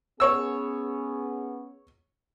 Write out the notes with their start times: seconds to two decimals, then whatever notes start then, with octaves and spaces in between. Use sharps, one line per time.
0.20 B3 C#4 G#4 C#5 E6